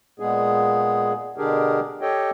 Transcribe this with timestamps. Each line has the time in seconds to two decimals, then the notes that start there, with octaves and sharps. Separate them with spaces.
0.20 A#2 G#3 B3 G#4
1.38 B2 D3 D4 G4 G#4 A#4
2.01 G4 A4 C#5 D#5 G5